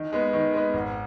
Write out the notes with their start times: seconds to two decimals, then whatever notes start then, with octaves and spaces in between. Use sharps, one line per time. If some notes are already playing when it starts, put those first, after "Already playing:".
Already playing: D#3
0.13 G#3 B3
0.33 D#3
0.53 G#3 B3
0.74 G#1